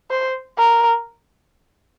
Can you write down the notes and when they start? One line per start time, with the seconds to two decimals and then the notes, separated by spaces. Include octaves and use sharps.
0.10 C5
0.58 A#4